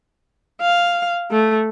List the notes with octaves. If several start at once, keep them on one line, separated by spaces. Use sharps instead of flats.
F5
A3